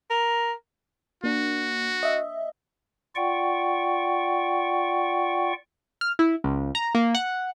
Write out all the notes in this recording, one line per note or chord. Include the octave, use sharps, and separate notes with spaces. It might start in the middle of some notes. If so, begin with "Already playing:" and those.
A#4
A#3 D4 F#4
D#5 E5
F4 D5 F#5 G5 C#6
F6
E4
C#2
A#5
A#3
F#5